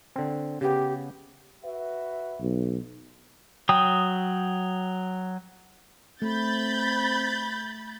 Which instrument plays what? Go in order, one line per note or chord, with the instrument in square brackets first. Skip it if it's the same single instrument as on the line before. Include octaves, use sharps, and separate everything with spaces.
[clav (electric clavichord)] D3 C4
[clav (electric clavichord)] C#3 B3 [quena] G4
[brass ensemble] F#4 B4 E5
[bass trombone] B1
[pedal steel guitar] F#3 G5 D#6
[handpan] A3 [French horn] C4 [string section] B5 G6 A6